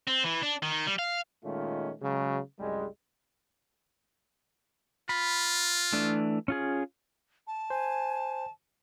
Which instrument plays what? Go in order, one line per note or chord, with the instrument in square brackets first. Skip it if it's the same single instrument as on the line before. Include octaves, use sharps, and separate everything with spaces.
[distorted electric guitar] C4
E3
D4
D#3
G3
F5
[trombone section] A#2 D#3 G#3 A3 C#4 F4
C#3 F#3 G#3
C2 F#2 G3 G#3
[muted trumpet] F4 [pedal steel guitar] B5
[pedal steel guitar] E3 A3 D4
C#4 F4 G#4
[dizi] A5
[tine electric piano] C5 [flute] G#5